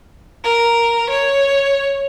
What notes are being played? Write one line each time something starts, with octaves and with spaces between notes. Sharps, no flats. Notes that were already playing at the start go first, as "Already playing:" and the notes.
A#4
C#5